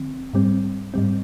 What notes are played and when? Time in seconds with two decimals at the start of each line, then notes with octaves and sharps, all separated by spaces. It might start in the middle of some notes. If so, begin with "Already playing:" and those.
Already playing: D3 F3 C4
0.34 G#2 G3 C4
0.94 G#2 G3 C4